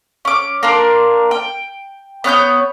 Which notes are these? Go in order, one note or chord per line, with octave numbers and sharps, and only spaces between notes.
C#4 D6
A#3 D4 A#4 C6
G5
B3 C#5 F#6 G6